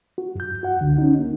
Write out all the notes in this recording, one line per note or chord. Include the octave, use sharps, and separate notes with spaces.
F#4
F#2 G6
F#4 F#5
C#2 D3
C#4 D#4
A#3